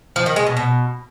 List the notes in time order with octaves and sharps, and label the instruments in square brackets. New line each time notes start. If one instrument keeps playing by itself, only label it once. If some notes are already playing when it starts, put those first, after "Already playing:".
[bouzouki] F3
D#3
G#3
B2
B2